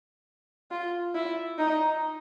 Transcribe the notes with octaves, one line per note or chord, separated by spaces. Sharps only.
F4
E4
D#4